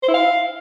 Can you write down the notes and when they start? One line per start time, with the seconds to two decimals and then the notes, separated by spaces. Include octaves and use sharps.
0.03 C5
0.08 E4
0.14 F5